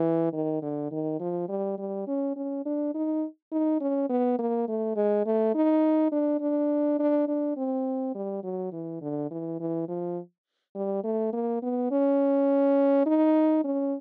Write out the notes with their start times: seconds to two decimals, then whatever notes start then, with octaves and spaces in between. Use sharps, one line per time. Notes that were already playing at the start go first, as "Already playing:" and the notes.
Already playing: E3
0.33 D#3
0.62 D3
0.91 D#3
1.20 F3
1.49 G3
1.78 G3
2.07 C#4
2.36 C#4
2.66 D4
2.94 D#4
3.52 D#4
3.81 C#4
4.09 B3
4.39 A#3
4.68 A3
4.96 G#3
5.26 A3
5.54 D#4
6.12 D4
6.41 D4
6.99 D4
7.28 D4
7.57 C4
8.15 G3
8.43 F#3
8.72 E3
9.01 D3
9.31 E3
9.60 E3
9.88 F3
10.75 G3
11.04 A3
11.33 A#3
11.62 B3
11.91 C#4
13.06 D#4
13.64 C#4